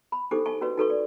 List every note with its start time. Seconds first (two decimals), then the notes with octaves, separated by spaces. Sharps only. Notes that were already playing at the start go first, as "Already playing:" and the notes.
0.12 B5
0.31 D4 D#4 G4 A4 C5 D6
0.46 D#5 G#5 A5 C#6
0.61 C#4 F#4 B4 C#5 D#5
0.78 D#4 F#4 A4 B4 C#5 C#6
0.90 D5